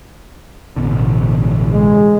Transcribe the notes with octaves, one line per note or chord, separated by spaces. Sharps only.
A1 B2 D3
G#3